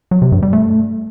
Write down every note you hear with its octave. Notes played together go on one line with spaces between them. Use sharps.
F#3
C3
G2
G3
A3